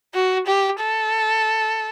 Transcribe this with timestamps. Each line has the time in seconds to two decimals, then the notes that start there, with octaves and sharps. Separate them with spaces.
0.14 F#4
0.47 G4
0.80 A4